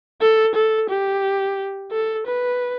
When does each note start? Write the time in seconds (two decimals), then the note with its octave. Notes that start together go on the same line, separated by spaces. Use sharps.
0.22 A4
0.55 A4
0.90 G4
1.92 A4
2.27 B4